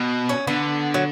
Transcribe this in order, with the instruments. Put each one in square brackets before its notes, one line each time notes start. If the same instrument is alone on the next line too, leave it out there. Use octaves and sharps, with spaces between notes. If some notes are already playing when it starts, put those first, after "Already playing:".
Already playing: [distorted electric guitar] B2
[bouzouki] C#4
[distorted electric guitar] D3 [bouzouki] B3
[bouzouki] F#3